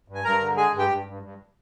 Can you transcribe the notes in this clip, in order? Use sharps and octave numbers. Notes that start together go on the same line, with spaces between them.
G2
G#5
G2 A#4 A#5
D3
G#3 G#4 G#5
G2
G4 G5
G2
G2
G2